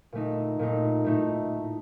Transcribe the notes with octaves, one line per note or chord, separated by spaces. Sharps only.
A#2 A3 D#4
A#2 A3 D#4
A2 A3 D#4